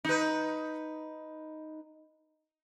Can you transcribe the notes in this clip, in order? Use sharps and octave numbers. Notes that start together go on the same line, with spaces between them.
D#4 B4